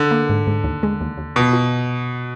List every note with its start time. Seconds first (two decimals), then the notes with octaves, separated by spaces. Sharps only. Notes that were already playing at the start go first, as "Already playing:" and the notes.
Already playing: D3
0.11 A#3
0.29 G#2
0.47 G#2
0.64 D#2
0.83 G#3
1.01 D#2
1.18 D#2
1.36 B2 F4
1.53 F4